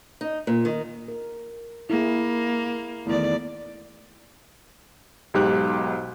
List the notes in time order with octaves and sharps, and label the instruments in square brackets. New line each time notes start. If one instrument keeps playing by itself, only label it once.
[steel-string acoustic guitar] D#4
A#2
D#3
[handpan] A#4
[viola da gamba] A#3 [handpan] E4 G#4
[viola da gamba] E2 D5 [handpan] D#3 E3 A3
[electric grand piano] B1 G#2 G4 F#6